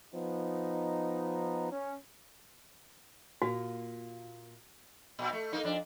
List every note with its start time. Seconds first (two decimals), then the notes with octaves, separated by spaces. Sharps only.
0.14 F3 B3 D#4
1.72 C#4
3.42 A#2 A#3 F#4
5.19 A#2
5.33 A3
5.53 A#3 D#4
5.64 F2 D4